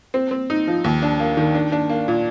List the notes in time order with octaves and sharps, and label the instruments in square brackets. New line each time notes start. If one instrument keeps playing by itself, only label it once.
[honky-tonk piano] C4
C4
D#4
F3
D#2
D4
A#3
D#3
D4
D4
A#3
A#2